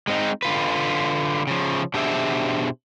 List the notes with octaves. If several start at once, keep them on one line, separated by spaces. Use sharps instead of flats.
G#3 C4 D#4
D3 F4 B4
C#3 F3
B2 D4 G4 G#4 C5 E5